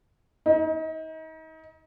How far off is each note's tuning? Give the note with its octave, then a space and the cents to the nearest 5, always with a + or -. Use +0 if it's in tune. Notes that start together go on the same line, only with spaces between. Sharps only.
D#4 +35